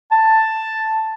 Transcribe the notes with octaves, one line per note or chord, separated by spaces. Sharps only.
A5